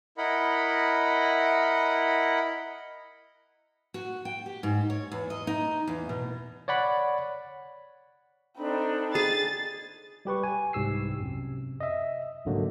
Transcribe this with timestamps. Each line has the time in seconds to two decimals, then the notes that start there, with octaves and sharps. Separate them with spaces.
0.18 E4 A#4 D#5 F#5 B5
3.94 F#4
4.25 G5
4.46 G4
4.63 G#2
4.90 C#5
5.12 E2
5.30 D#5
5.47 D#4
5.87 E2
6.09 B2
6.68 C#5 D5 F#5 B5
8.58 C4 D4 D#4 A4 B5
9.15 G#4 A6
10.25 G3 G4 B4 C#6
10.44 G#5
10.73 C2 G#2 G4 E6 C7
11.20 F#2 C3
11.80 D#5 E5
12.45 C2 G#2 D3 F#3 A#3